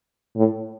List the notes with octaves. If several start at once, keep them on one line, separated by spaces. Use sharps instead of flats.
A2